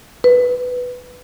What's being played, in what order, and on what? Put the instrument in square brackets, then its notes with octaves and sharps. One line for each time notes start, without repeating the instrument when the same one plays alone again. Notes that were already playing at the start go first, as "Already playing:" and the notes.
[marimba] B4